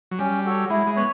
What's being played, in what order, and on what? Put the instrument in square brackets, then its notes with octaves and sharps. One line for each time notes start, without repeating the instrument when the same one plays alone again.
[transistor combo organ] F#3
[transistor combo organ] G3 [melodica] C#4
[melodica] F#4 A4 C#5
[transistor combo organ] G#3 [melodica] E4
[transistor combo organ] G#3
[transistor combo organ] B3 [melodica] C#5